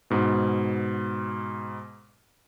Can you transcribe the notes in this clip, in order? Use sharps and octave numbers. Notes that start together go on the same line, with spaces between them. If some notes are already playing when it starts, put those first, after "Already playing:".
G#2 B2